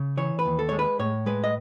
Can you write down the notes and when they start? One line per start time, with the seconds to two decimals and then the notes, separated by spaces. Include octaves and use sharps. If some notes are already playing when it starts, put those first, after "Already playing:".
Already playing: C#3
0.17 E3 C#5
0.39 B4
0.45 D#2
0.59 A4
0.69 G#3 C#5
0.79 B4
0.99 A2 C#5
1.26 G#3 B4
1.44 D#5